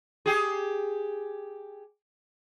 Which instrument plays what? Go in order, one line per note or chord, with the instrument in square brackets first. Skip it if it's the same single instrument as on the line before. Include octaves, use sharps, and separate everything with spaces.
[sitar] G4 G#4